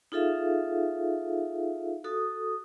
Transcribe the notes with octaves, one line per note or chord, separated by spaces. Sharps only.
D#4 F4 G#4 A4 E5 F5
F#4 A4 D#6